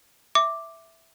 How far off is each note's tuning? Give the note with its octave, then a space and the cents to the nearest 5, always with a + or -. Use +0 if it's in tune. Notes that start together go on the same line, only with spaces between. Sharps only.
E5 +0 D6 +0